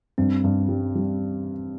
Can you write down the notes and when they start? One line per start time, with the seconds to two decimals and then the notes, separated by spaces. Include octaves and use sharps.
0.18 G2 C4
0.44 G2
0.68 G3
0.95 G3